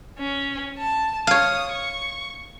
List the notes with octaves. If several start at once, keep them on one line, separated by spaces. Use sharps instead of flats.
C#4
A5
C#5 F5 D#6
C#6